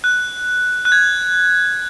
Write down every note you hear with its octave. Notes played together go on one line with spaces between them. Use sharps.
F#6
F#6
G#6